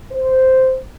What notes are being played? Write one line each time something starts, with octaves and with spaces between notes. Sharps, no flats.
C5